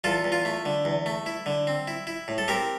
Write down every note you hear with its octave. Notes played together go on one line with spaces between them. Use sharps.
E2 F4 A4
E2
F4
A3
D3
E2
A3
E4
D3
C4
E4
E4
A2
A4
C4 G4 A#4